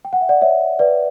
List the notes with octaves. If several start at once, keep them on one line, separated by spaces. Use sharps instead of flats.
G5
F#5
E5
D5 F#5
C#5 E5
B4 D5